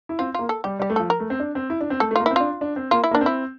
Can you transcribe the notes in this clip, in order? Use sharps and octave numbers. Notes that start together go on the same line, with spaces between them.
E4
C4 F4
A#3 F4
A4
G3 G4
G3 G4
A3
F3 A4
A#4
A3
C4
D4
C4
E4
D4
C4
A3 A4
A3
A#3 F4
E4
C4
D4 F4
D4
C4
A#3 F4
E4
A#3
D4
C4
E4